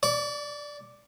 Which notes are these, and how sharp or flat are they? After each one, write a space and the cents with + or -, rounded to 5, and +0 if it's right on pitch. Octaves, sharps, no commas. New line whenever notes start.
D5 +0 D6 -45